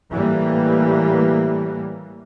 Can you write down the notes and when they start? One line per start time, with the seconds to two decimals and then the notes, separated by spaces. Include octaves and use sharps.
0.10 A2 E3 G3 A#3